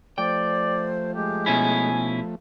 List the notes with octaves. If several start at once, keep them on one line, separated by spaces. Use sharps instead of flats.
F3 A3 C5 D5 G5
G#3 G4
B2 C#4 E4 G#5